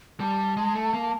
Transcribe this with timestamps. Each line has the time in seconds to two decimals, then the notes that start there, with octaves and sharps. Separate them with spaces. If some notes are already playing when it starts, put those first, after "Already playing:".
0.20 G3 A5
0.57 G#3
0.75 A3
0.94 A#3